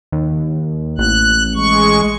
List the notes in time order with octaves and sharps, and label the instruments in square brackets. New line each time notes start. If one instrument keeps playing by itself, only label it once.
[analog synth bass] D#2
[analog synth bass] A1 [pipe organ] F#6
[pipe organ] G#3 C#6